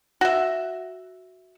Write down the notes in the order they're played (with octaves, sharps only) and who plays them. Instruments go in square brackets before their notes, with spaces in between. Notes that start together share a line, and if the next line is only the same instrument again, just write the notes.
[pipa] F#4 E5